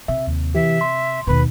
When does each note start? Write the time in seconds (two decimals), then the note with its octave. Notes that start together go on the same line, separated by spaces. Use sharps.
0.08 C3 E5
0.27 D#2
0.55 E3 G4 E5
0.81 C6
1.27 D#2 B2 B4